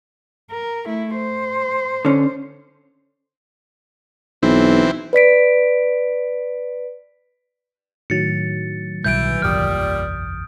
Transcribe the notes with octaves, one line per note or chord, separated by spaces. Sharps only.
A#4
A3 E4
C5
D3 C#4
B1 E3 C4
B4 D5 B6 D7
A2 D#3 F#3 A6 C#7
B1 B2 E3 G3 G6 D7
F#1 B1 E2 A#2 G3 D#6 F6